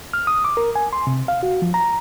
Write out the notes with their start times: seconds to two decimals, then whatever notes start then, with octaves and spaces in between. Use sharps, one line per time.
0.13 F6
0.27 D#6
0.45 D6
0.57 A#4
0.76 G#5
0.93 C6
1.07 C3
1.28 F5
1.43 F#4
1.62 F3
1.74 A#5